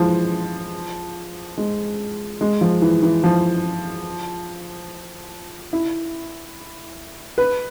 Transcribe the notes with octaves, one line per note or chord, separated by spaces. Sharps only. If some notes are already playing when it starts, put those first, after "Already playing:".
Already playing: E3 F3 G#3
G#3
G#3
F3
E3
E3
F3
E4
B4